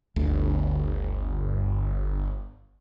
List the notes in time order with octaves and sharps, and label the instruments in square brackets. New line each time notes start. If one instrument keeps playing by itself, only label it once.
[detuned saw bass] G1 [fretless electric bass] D2